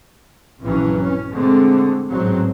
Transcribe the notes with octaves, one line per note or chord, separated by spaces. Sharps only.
A#1 G2 E3 F#3 C#4
C#4
D3 G#3 A3 C4
A1 G#2 F#3 G#3 C4